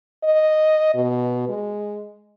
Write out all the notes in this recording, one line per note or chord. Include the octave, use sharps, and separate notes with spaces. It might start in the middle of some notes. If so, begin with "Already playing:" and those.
D#5
B2
G#3